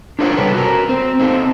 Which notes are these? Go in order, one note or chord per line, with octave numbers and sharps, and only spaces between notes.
D4 F4 A#4 C5 C#5 F#5
C3 G3 A4 B4
F#4 A#4
C4
C4 D#4 A4